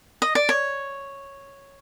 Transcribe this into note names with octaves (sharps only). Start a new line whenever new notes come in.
D#5
D5
C#5